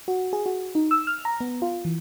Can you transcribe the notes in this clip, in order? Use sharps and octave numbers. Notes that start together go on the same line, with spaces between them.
F#4
G#4
F#4
D#4
E6
F6
A#5
B3
F4
E3